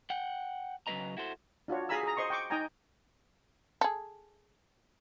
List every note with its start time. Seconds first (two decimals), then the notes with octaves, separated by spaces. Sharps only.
0.10 F#5 G5
0.87 C#3 F#3 C#4 B4 D#5 A#5
1.17 E4 F#4 A4 C5
1.68 D4 F4 F#4 C#5
1.89 G#4 F5 G#5 A#5 B5 E6
2.03 G#4 A#5
2.17 C5 D#5 C6 C#6
2.30 G5 C#6 D6
2.50 D#4 D#5 G5 G#5 A#5
3.81 G#4 A4